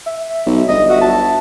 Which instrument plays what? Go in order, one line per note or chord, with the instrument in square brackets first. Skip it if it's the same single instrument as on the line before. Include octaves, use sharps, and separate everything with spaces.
[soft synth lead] E5
[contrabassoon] B1
[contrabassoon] G1 [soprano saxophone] D#5
[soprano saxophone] F#4 [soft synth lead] E5
[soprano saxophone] A5